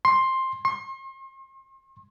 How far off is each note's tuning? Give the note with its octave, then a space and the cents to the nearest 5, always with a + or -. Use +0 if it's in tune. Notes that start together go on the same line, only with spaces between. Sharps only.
C6 +10
C6 +40